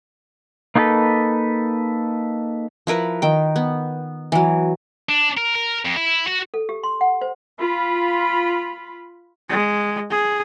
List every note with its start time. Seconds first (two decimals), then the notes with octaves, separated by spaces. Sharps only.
0.75 A#3 D#4 F4 G#4 A4 B4
2.87 F3 E4 A#4 B4
3.22 D#3 G5
3.56 B3
4.32 E3 F#3
5.09 D4
5.37 A#4
5.55 A#4
5.85 F2
5.96 E4
6.27 F#4
6.54 A4
6.69 G4
6.83 C6
7.01 F#5
7.21 C5
7.58 F4 B5
9.50 G#3
10.11 G#4